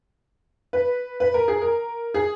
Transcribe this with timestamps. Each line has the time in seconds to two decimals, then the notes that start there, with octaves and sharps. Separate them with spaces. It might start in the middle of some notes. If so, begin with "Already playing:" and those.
0.73 B4
1.20 B4
1.34 A#4
1.48 G#4
1.62 A#4
2.14 G#4